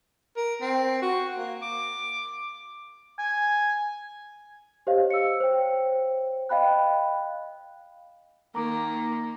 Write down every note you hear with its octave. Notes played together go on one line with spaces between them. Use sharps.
A#4
C4
F#4
A#3
D6
G#5
G4 C5 C#5 D#5 F5
E6 C#7
C5 C#5 G5
D#5 F5 G5 B5 F#6
D#3 A#3 A#5 D6